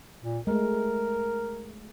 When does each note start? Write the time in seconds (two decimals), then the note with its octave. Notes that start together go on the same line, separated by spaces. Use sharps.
0.24 A#2
0.47 G#3 A3 A#4